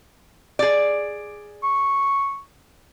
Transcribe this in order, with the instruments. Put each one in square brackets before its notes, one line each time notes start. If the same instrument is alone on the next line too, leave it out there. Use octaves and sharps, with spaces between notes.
[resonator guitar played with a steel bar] G#4 D5
[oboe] C#6